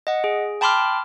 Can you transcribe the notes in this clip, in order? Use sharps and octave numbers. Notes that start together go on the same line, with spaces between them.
D#5 F#5
G#4
G5 A5 B5 C6 D6 F6